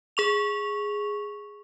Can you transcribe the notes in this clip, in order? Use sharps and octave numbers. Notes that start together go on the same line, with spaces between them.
G#4 C#6 F7